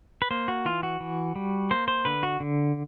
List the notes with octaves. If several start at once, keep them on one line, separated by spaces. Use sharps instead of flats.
B4
A#3 C5
F#4
E3 F4
F#4
E3
G3
A#3 C5
C5
D3 B4
F#4
D3